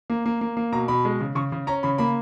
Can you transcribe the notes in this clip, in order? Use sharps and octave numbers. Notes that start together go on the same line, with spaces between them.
A#3
A#3
A#3
A#3
B2 A#5
B2 B5
G#3
C#3
C#3 C#6
C#3
C#4 A#5
C#3 B5
A#3 B5